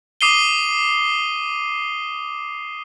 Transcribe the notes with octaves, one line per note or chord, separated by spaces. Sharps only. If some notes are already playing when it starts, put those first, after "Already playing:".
D6 D#6 C7 D#7 G7